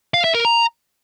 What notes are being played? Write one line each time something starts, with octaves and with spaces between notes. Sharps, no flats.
F5
E5
A#4
A#5